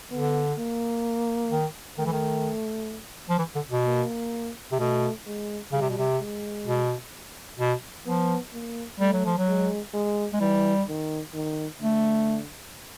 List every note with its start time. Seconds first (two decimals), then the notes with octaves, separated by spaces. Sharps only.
0.11 D3 B3
0.58 A#3
1.51 D#3
1.98 D#3 A3
2.06 E3
2.12 D#3
3.29 F3
3.38 E3
3.55 D3
3.70 B2
3.86 A#3
4.72 C3
4.79 B2 A3
5.26 G#3
5.72 C#3 G3
5.81 C3
5.90 B2
5.98 C3
6.19 G#3
6.66 B2
7.59 B2
8.06 F3 B3
8.53 A#3
9.00 G3 A3
9.13 F#3
9.25 F3
9.38 F#3
9.47 G#3
9.94 G#3
10.33 G#3
10.41 E3 G3
10.88 D#3
11.34 D#3
11.81 D3 A3